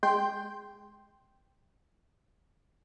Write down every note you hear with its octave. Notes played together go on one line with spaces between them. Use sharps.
G#3 G5 C6 G6